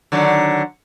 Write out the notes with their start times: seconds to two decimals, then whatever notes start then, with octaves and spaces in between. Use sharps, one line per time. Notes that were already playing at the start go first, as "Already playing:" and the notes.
0.12 D3 D#3 F#3